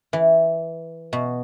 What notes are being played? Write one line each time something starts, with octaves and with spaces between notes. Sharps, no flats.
E3
B2